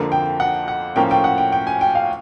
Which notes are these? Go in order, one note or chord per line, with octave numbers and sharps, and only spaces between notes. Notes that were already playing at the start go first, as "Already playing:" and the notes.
Already playing: F2 D3 F3 A#3
G5
F#5
F#5
A2 F3 A#3 C#4 G5
G5
F#5
G5
G5
G#5
G5
F5